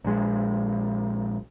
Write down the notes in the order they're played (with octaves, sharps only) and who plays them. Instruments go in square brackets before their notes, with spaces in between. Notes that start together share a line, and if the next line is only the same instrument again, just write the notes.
[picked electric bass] A#1 G#3